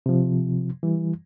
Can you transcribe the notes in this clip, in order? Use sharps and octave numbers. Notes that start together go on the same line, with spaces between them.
C3 F3
E3 G3